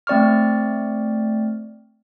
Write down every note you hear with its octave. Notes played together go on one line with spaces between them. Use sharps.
A3 C4 D5 C#6 F6